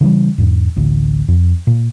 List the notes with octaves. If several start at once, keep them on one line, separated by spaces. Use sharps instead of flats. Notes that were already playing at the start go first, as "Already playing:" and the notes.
C#3 E3 F#3 G3
E2 G#2
A1 D2
F2
A#2